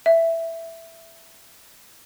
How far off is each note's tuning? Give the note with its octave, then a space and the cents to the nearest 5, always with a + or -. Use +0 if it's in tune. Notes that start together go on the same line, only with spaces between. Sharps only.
E5 +5